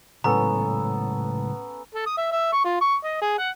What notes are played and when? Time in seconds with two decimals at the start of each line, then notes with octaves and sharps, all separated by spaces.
0.24 A2 C#3 F#3 G#3 B3 C#4 A4 A#5
1.94 A4
2.06 D#6
2.17 E5
2.32 E5
2.53 C#6
2.65 F4
2.81 C#6
3.04 D#5
3.22 G#4
3.38 F#5